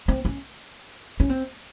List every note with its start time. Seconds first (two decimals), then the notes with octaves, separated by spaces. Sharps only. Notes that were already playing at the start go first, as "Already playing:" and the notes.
0.08 C4
0.25 C#4
1.20 C#4
1.29 C4